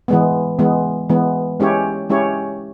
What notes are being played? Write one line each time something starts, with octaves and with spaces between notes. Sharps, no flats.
E3 G#3 B3
E3 G#3 B3
E3 G#3 B3
G#3 C#4 E4 G4 C#5
G#3 C#4 E4 G4 C#5